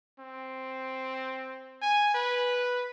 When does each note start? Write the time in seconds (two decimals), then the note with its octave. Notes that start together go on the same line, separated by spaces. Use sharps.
0.19 C4
1.82 G#5
2.14 B4